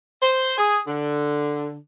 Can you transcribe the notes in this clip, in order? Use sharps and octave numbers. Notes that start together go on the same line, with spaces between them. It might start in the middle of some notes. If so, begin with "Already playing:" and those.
C5
G#4
D3